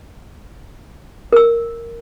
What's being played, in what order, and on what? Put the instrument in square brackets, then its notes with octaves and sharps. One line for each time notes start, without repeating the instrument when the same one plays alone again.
[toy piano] A#4 E6